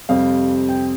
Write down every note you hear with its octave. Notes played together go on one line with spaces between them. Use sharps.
F2 C3 G3 C4 F5
G5